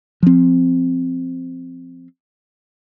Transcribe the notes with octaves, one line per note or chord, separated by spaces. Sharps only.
F3 C4